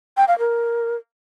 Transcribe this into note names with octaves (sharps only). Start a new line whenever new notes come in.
G5
F5
A#4